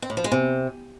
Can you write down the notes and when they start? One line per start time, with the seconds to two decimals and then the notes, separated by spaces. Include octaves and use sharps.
0.02 C4
0.10 A2
0.17 F3
0.24 G#3
0.32 C3